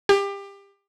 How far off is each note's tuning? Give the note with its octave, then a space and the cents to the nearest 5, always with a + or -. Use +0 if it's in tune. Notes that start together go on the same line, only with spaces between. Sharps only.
G4 +25